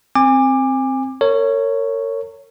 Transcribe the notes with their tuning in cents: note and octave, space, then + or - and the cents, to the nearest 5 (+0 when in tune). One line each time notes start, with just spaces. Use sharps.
C4 +0 G#5 -25 D6 +15
A#4 -35 C#5 +0